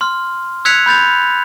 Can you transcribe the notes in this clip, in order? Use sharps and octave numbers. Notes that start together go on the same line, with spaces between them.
C6 F6
E6 F#6 G#6 B6 C#7 F7
B5 G6 A6 F7